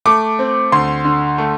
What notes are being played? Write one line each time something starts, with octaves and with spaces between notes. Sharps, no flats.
A3 D6
C4
D2 C6
D3
A3